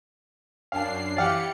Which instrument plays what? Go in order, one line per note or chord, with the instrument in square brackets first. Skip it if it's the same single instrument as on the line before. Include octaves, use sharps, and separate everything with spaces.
[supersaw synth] F#2 D4 C7 [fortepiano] F5 A5
[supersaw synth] E3 G4 C#7 [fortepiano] D5 F5 F#5